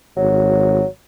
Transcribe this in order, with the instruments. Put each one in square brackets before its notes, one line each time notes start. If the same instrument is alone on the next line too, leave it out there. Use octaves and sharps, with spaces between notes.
[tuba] G#1 [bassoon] F#3